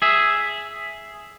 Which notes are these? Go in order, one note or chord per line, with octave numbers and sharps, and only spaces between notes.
G#4 E5